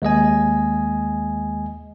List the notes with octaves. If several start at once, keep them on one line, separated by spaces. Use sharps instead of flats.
D#2 G#3 D#5 G#5